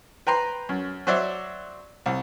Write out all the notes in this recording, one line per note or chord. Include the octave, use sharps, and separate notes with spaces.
B4 G5 A#5 C6
F#2
F#3 F#4 C5 D5 E5
C2